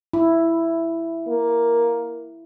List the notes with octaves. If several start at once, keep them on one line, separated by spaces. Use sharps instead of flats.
E4
A#3